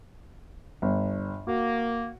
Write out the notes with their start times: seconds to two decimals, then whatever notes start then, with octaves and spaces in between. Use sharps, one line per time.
0.82 G1
1.47 A#3 F#4